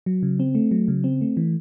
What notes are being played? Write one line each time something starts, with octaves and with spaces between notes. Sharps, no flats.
F#3
C#3
C4
A3
F#3
C#3
C4
A3
E3